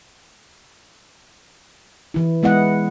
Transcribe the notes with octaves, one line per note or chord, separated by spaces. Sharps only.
E3 E4
G#3 B3 E4 D#5 F#5